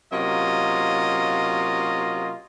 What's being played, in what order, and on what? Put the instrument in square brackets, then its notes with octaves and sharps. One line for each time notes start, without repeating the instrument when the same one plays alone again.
[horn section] C3 F#3 A#3 C#4 F4 D#5